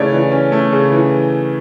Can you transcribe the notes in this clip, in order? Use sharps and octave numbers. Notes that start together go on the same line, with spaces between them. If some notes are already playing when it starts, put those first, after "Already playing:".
Already playing: C#3 E3 A3 C#4 C#5 D5
E3
C#4
A3
C#3
E3